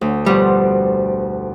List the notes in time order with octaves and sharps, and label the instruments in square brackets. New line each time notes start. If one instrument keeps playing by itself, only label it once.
[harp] D2
[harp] F2 B2 C5 [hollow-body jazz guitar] G3